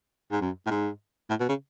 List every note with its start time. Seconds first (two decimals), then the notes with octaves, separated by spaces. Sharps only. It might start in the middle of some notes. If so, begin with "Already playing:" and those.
0.32 G#2
0.41 F#2
0.66 A2
0.70 G#2
1.30 A2
1.40 B2
1.49 C#3